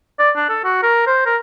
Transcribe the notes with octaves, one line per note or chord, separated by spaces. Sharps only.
D5
D4
A4
F#4
A#4
C5
A#4